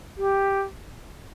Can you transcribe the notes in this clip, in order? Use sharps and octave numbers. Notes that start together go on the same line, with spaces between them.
G4